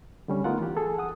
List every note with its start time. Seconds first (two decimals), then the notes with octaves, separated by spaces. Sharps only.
0.28 D3 G3 C#4
0.44 A3 B3 D#4 F4 A#4 F#5
0.60 E3 G4
0.77 G#4 A4
0.98 F#5 D#6